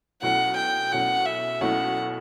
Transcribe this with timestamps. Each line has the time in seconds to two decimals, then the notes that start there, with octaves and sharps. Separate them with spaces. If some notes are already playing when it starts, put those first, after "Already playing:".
0.22 B1 B2 A3 C#4 E4 F#5
0.57 G5
0.91 B1 B2 A3 C#4 E4 F#5
1.26 E5
1.61 B1 B2 A3 C#4 E4 F#5